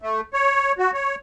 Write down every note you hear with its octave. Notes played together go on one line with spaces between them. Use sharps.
A3
C#5
F#4
C#5